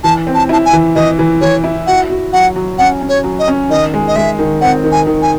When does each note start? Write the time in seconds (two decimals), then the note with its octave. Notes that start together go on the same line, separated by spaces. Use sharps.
0.03 E3 A5
0.27 C4
0.34 A5
0.49 E4 A5
0.65 G#5
0.73 E3
0.95 E3 D#5
1.19 E3
1.41 E3 C#5
1.64 E4
1.87 F#4 F#5
2.10 F#4
2.33 F#3 F#5
2.56 F#3
2.78 C#4 F#5
3.01 C#4
3.09 C#5
3.24 F#3
3.39 D#5
3.48 C#4
3.69 D#3 D#5
3.93 G#3
4.07 D#5
4.15 G#3 E5
4.39 D#3
4.61 C4 F#5
4.84 D#3
4.91 G#5
5.07 D#3
5.22 G#5